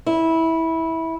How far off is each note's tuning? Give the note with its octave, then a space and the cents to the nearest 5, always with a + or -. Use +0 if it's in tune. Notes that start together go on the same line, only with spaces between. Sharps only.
E4 -15